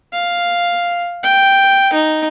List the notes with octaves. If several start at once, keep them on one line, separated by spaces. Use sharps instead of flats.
F5
G5
D#4